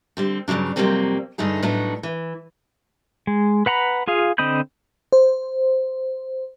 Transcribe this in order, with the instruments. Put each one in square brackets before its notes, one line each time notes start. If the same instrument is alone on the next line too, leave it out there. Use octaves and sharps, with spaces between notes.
[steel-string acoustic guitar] D3 G3 C4
G2 C#3 E3 F#3 D4
F2 C3 F#3 G3 A#3 C4
G2 D3 A3 D#4 G#4
A2 F#3 B3 D4 D#4 F#4
E3
[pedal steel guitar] G#3
B4 F#5 A#5 B5
F4 G#4 F5
D3 C4 D#5 B5 G6
[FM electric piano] C5